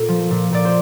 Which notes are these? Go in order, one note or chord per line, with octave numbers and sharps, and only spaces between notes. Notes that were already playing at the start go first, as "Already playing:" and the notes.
Already playing: A#2 A4
F3
A#2
A#2 D5
C5